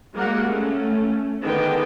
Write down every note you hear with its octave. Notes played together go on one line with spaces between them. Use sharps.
G3 G#3 A#3 F#4 A#4 F#5
A3 C#4
D3 D#3 B3 G#4 G5